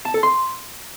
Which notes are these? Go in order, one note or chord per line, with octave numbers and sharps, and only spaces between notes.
A5
A4
C6